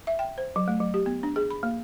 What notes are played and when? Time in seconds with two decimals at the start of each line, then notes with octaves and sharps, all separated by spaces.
0.07 E5
0.19 G5
0.38 C5
0.56 F#3
0.68 A3
0.80 F#3
0.94 G4
1.06 B3
1.23 D4
1.36 G#4
1.51 B5
1.63 A#3